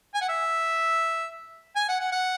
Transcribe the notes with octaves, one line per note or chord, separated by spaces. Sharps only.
G#5
F#5
E5
G#5
F#5
F#5
F#5